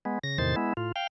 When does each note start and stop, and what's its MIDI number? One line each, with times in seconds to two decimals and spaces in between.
0.05 0.19 56
0.05 0.19 59
0.23 0.38 49
0.23 0.38 94
0.38 0.55 40
0.38 0.55 45
0.38 0.55 48
0.38 0.55 51
0.38 0.55 72
0.38 0.55 93
0.56 0.73 56
0.56 0.73 59
0.56 0.73 64
0.77 0.92 45
0.77 0.92 65
0.96 1.07 77
0.96 1.07 79